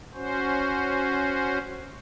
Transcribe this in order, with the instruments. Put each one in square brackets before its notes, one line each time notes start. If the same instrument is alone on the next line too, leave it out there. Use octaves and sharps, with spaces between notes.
[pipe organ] C#4 F#4 C5